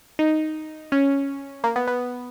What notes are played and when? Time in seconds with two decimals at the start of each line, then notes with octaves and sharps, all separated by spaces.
0.19 D#4
0.92 C#4
1.64 A#3
1.76 B3
1.87 B3